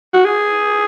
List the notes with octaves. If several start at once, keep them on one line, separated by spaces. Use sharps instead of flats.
F#4
G#4